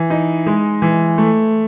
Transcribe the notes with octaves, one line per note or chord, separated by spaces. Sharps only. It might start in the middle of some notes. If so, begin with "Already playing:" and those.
Already playing: E3
D#4
G#3
E3
A3